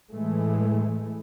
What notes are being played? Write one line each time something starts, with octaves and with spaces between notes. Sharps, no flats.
A2 E3 G#3 A3